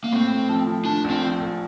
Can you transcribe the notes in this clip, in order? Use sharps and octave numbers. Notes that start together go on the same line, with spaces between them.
A#3
A2 C4
A2
F3
F3
F3 D4
A#1
C4
F3
A#1